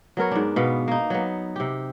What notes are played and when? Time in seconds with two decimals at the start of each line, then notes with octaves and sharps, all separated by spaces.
0.17 F#3 B3 A#4 C#5
0.31 G#2 D4
0.56 B2 B3 F5
0.88 A#3 D#4
1.10 F#3 B3
1.56 C3 G4